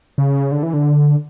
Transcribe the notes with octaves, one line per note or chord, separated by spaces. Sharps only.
C#3
D3
E3
D3